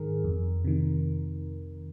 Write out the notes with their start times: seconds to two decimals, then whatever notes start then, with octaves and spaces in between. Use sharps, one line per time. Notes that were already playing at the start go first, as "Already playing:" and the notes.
Already playing: G#2 D#3 G#4 A#4
0.24 F2
0.65 C3 D#3